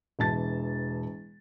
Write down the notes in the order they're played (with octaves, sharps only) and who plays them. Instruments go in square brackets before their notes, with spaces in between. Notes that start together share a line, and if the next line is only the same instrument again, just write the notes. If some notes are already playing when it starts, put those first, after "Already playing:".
[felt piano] E1 E3 A5 A6